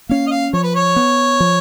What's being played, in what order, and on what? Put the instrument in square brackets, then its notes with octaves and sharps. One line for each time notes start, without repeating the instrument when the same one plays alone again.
[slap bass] A#3 C#4 [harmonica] F5
[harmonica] D#5
F5
[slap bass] F3 [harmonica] C#5
[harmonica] B4
C#5
[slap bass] B3
F3